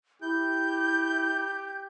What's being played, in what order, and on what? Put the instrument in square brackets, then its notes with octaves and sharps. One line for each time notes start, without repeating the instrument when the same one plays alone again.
[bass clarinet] E4 [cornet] G4 [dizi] G6